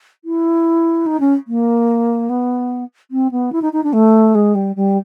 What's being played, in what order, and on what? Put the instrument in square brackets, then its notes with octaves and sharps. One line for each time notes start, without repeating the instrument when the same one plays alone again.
[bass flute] E4
D#4
C#4
A#3
B3
C4
B3
E4
D#4
D#4
D4
A3
G#3
G3
G3